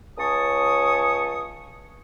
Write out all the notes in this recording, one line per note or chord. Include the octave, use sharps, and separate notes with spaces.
C#2 C#5 G#5 A5 C#6 D#6